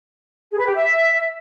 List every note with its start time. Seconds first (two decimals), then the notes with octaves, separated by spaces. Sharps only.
0.51 G#4
0.58 B4
0.66 G4
0.74 E5